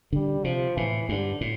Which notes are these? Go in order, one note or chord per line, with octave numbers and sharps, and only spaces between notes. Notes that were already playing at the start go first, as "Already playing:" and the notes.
D3 G3
C3 F3
A2 E3
G2 D3
A2